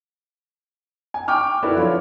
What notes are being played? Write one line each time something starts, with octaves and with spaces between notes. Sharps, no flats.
G#5
G5 C#6 D6 F6
D4 E4 F#4 A4 B4 D5
F3 F4 C#5 D5